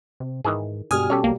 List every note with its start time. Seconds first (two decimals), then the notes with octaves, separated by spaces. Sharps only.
0.20 C3
0.45 G#2 D#3 E3 G#4
0.91 G2 B2 G3 G#5 D#6 F6
1.10 C#4 G4 A4 C#5
1.24 B1 A#3